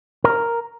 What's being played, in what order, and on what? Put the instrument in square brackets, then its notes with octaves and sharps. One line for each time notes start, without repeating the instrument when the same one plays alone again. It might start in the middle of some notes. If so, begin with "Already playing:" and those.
[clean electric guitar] A#4